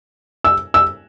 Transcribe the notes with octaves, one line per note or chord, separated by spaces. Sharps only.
E6
E6